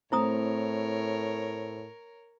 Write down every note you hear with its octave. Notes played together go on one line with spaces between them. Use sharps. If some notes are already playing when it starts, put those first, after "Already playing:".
A2 A3 C4 E4 A#4 C#5 A#5 D#6